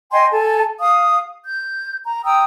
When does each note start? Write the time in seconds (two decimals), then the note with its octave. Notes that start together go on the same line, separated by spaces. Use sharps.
0.12 D#5 G5 G#5 C6
0.31 A4 G#5 A5
0.80 F5 D#6
1.44 G6
2.04 A#5
2.25 G5 A#5 D#6 E6